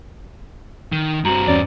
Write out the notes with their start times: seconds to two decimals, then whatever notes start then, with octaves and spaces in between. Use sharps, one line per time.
0.92 D#3
1.24 G2 C4 F#4 A#5 F#7
1.48 E2 C#4 D5